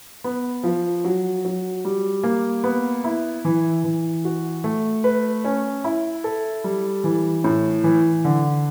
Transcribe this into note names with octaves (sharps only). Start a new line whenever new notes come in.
B3
F3
F#3
F#3
G3
A#3
B3
E4
E3
E3
F#4
A3
B4
C#4
E4
A4
G3
E3
A2
E3
D3